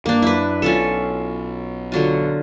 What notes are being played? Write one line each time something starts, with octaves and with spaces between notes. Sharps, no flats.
G2 A#3 D4
F#2 E4 B4
B1 C#4 F4 A4
D3 F#3 F4